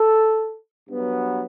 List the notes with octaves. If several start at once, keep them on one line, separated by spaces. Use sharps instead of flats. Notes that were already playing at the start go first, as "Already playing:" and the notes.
Already playing: A4
G2 F#3 B3